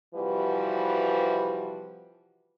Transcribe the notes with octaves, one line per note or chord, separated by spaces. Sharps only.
C3 E3 F3 G3 F#4 B4